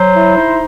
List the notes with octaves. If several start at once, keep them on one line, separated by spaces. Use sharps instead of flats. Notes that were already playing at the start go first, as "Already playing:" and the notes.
Already playing: F#3 C5
E4
D#4